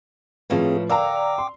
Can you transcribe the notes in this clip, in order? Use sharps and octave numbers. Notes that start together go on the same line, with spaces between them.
A2 F3 A3 A#3 C4 C#4 G#4 B4
D3 A#4 D5 F5 G5 A#5 D6 E6
C6